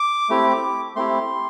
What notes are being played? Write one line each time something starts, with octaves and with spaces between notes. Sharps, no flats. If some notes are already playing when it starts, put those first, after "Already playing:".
Already playing: D6
A3 C4 E4 G4
A3 C4 E4 G4 C6